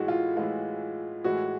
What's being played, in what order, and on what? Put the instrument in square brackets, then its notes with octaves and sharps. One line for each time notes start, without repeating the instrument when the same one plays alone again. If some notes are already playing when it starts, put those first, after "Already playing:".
Already playing: [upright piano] A2 E3 G#3 [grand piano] F#4
[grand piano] F4
[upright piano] A2 E3 G#3 [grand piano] F4
[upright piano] A2 E3 G#3 [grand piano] F#4